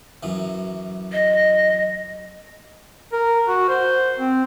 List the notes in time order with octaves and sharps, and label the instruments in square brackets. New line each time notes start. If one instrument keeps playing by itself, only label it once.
[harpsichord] F#2 E3
[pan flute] D#5
[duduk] A#4
F#4
C5
C4